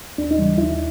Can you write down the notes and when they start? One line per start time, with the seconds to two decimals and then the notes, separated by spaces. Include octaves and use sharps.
0.18 D#2 D4
0.31 D#4
0.39 C#3 E3 G3
0.58 D#2 E4